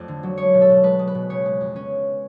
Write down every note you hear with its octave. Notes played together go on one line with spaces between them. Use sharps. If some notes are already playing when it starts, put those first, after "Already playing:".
Already playing: F2 A3 D5
D3
F#3
G#3 C#5
B2
A4
B2
G#3 B4
G#3
B4
B2
C#3 C#5
G#3
F2
C#4